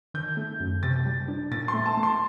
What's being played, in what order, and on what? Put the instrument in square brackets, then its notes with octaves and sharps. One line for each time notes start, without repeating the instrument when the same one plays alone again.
[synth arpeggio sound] D#3 [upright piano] G6
[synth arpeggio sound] A3
F#2
[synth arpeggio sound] C3 [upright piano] A6
[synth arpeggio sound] G3
D4
[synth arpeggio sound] A#2 [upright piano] A6
[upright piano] C6
[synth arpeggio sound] A3
[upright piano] A5
[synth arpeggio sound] A3
[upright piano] C6